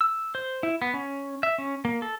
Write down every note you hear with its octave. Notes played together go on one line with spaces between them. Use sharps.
E6
C5
E4
B3
C#4
E5
C#4
A#3
A4